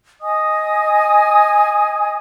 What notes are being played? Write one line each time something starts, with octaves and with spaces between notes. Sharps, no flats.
D#5 G#5 D#6